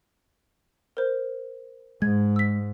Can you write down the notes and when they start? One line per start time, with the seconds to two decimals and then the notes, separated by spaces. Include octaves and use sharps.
0.97 A#4 C5
2.02 G#2 G#3 G#6
2.36 E6 B6